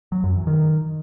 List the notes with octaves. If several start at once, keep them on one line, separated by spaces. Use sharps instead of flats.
F#3
F#2
E3
D#3